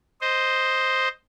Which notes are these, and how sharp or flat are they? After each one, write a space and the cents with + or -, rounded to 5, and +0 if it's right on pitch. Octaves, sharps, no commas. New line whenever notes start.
C5 +0 D#5 +0